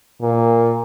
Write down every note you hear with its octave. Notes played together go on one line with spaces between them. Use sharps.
A#2